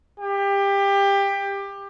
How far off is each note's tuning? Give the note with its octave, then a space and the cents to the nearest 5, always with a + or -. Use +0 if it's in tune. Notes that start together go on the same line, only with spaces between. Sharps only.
G4 +20